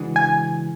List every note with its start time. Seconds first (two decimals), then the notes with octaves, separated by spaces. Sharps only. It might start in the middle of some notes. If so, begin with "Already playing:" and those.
Already playing: C#3 E3 G#3 D4 F#4
0.16 G#5